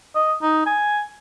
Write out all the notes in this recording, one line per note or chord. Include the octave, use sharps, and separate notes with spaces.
D#5
D#4
G#5